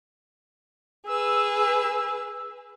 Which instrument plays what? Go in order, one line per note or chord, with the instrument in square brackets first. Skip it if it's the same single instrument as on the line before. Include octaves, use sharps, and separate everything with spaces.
[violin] G#4 B4 [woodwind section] E6